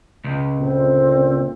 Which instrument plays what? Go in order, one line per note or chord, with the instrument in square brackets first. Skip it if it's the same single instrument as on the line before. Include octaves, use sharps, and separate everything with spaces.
[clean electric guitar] C#2
[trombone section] A#2 D3 [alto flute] C4